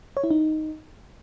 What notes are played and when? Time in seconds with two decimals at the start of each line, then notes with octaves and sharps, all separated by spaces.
0.17 C#5
0.24 E4
0.31 D#4